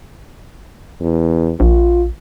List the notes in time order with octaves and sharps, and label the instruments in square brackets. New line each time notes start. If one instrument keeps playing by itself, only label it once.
[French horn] E2
[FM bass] A#1 [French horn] F4